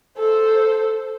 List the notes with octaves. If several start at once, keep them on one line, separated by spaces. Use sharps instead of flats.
A4 C5